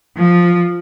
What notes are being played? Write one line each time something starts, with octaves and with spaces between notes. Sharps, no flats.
F3